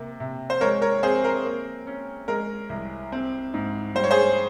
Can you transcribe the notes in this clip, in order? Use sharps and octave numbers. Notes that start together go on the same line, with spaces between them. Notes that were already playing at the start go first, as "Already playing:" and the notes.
Already playing: C3 A#3
C3
C5
G#3 A#4 C#5
A#4 C#5
C4 G#4 C5
A#4
A#3
C#4
G#3 A#4
C2
C4
G#2
G3 C5
C#5
G#4 C5